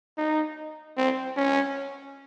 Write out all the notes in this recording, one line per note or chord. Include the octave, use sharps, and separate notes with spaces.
D#4
C4
C#4